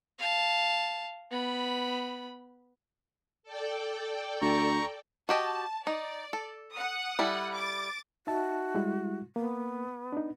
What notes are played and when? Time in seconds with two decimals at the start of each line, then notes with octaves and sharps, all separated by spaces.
0.19 F5 A5
1.31 B3 B5
3.43 A4 D5 G5
4.41 D2 A#5 C#6
5.29 F#4 G4 D#5 A5
5.87 D#4 D5
6.33 A4
6.73 F#5 D#6
7.19 G3 E4 A4
7.55 D6 A6
8.27 D#4 F#4 E5 A5
8.75 G3 G#3 E4
9.36 A#3 B3
10.12 D4 D#4